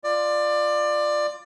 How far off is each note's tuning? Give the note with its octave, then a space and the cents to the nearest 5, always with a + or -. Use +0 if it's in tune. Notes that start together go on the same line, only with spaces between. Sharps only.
F4 +0 D5 +20